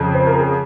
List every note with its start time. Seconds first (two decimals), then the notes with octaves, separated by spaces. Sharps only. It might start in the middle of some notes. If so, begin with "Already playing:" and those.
Already playing: F2 C#3 F3
0.15 C5
0.27 A#4
0.39 G#4